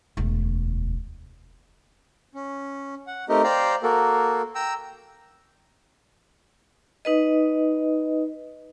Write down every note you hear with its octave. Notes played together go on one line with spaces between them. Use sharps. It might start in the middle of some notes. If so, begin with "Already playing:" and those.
E1 D2
C#4
F#5
A3 C4 D#4 G4 A#4 D#5
C5 D5 F5 G5 A#5
A#3 F#4 A4 A#4
G5 A#5 E6
D#4 B4 D#5